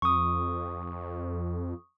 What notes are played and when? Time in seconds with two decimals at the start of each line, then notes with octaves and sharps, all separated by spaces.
0.02 F2 C#6 D#6